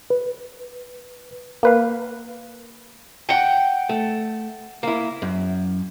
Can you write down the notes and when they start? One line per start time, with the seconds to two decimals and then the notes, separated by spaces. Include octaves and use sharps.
0.10 B4
1.63 A#3 B4 F5
3.29 F#5 G5
3.89 A3
4.83 A#3 E4
5.22 F#2